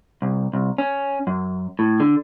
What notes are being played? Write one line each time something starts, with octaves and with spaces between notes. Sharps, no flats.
C2
C2
C#4
F#2
A2
D3